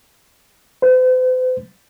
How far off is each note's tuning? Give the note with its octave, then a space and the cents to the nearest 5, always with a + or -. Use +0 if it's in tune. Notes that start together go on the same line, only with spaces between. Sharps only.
C5 -45